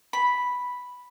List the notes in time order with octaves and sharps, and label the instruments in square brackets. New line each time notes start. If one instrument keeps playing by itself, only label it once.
[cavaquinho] B5